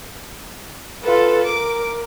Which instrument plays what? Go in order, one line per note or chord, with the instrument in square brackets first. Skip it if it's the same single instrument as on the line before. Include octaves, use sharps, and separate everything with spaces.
[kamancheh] F4 B4 [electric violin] A4
[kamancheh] A#4 [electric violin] D6